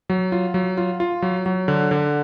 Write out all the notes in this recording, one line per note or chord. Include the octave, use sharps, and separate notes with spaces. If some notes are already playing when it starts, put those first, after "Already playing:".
F#3
F4
F#3
F4
F4
F#3
F#3
D3
D3